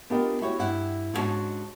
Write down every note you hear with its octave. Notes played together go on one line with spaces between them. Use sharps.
B3 D4 F4 G4 A#4 D#5
E4 F#4 G4 C#5
G2 E4 F#5
G#2 G#3 C#4 D4 F#4 A5